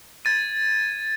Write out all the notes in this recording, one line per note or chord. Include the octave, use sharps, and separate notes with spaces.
G#6 A6 D#7